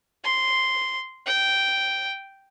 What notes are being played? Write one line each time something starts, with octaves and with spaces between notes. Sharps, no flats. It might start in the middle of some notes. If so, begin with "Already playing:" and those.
C6
G5